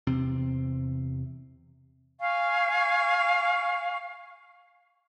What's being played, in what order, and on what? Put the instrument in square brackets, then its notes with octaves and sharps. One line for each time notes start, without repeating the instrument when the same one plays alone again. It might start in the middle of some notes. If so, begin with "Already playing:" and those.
[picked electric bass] E2 C3 C4
[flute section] F5 G#5 C#6